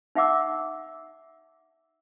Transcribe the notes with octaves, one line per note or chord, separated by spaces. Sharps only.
D#4 E5 F#5 D6 E6